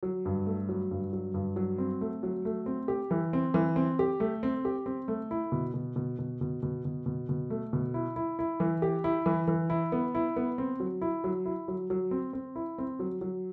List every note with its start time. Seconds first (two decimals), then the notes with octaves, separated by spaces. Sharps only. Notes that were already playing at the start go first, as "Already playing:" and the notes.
0.03 F#3
0.25 G2
0.46 A3
0.69 F#3
0.91 G2
1.13 F#3
1.34 G2
1.56 F#3
1.78 C4
2.01 A3
2.23 F#3
2.45 A3
2.66 C4
2.88 G4
3.11 E3
3.33 C4
3.54 E3
3.76 C4
3.99 G4
4.20 A3
4.43 C4
4.65 G4
4.86 C4
5.08 A3
5.31 E4
5.52 B2
5.74 B2
5.96 B2
6.19 B2
6.41 B2
6.63 B2
6.85 B2
7.06 B2
7.29 B2
7.50 A3
7.73 B2
7.94 E4
8.16 E4
8.39 E4
8.60 E3
8.82 G4
9.04 E4
9.26 E3
9.47 E3
9.70 E4
9.92 B3
10.15 E4
10.36 B3
10.58 C4
10.80 F#3
11.02 E4
11.24 F#3
11.46 E4
11.68 F#3
11.90 F#3
12.11 C4
12.33 C4
12.56 E4
12.78 C4
12.99 F#3
13.21 F#3